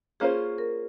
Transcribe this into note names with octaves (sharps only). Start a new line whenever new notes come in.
A#3 C#4 F4 G#4 C5
A#4